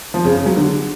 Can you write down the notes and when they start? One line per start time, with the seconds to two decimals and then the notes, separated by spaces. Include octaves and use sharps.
0.14 F3
0.25 C#3
0.35 C#3
0.46 F#3
0.57 D3